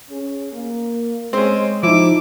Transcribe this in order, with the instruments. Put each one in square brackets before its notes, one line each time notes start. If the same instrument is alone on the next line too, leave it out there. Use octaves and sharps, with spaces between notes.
[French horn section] C#4 G#4
A#3
[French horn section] G#3 [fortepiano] C4 C#4
[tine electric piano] F3 D#4 [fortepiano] E4 [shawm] D6